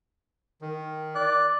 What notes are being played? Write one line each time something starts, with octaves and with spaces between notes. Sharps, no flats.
D#3
D5 F#6